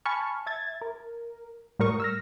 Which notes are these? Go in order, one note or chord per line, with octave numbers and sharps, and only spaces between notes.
G#5 A5 B5 C#6 F6
E5 G#6 A6
A#4
A2 G3 A#4 C#6 D#6
E6 F6 A#6